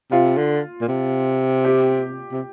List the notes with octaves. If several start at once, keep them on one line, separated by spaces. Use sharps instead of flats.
C3 F4
D3
A#2
C3
G4
C3